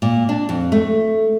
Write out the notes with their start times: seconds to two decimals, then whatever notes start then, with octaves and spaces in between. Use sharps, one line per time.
0.02 A#2
0.29 D4
0.49 F2
0.72 A3